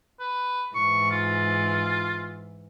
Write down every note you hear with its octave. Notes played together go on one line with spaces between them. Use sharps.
B4
G#2 E3 C#6
F4